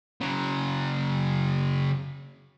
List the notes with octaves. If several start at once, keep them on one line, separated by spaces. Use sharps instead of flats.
C#3 F#3